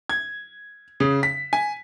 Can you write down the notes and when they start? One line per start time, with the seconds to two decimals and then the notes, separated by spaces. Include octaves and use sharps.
0.09 G#6
1.00 C#3
1.23 B6
1.53 G#5